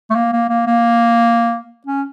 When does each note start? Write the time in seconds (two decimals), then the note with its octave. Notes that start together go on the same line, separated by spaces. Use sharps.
0.10 A3
0.16 A#3
0.33 A#3
0.50 A#3
0.67 A#3
1.87 C#4